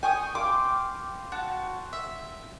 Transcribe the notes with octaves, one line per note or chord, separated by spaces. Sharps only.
G5 G#5 C#6 D#6
F5 C6 D6
F#4 A5
E5